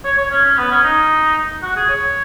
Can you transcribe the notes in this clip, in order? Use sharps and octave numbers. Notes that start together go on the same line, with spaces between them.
C#5
C#5
C#4
C#4
B3
C#4
D#4
F#4
G#4
C#5